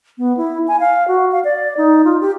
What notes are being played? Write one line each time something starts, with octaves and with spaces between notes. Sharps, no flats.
B3
E4
G#5
F5
F#4
F5
D5
D#4
F4
G4